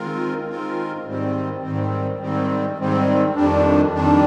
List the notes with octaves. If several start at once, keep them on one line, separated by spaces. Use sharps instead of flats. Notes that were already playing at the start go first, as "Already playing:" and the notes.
Already playing: D#3 G#3 C4 F4 A#4
D#3 G#3 C4 F4 A#4
G#2 D#3 G3 C4
G#2 D#3 G3 C4
G#2 D#3 G3 C4
G#2 D#3 G3 C4
F2 D#3 G3 D4
F2 D#3 G3 D4